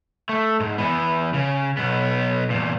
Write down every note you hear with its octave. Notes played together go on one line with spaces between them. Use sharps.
A3
G#2
E3 B3
C#3
B1 B3
E2 A#2